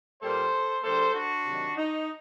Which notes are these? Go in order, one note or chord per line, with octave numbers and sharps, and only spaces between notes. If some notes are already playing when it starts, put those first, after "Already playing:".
A#2 G3 A#3 A4 C5
D3 G3 A#3 A4 C5
D4 F#4
C3 D#3 F#3
D#4